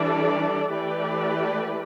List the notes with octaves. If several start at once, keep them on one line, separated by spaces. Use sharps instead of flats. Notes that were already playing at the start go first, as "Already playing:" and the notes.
Already playing: E3 G3 D4 A4 D5
E3 A3 G4 B4 D5